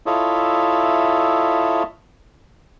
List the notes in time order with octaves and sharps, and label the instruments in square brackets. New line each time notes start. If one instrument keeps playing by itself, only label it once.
[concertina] E4 F4 A4 C#5 D#5 E5